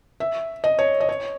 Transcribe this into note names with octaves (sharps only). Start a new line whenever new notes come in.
E5
D#5
C#5
D#5
C#5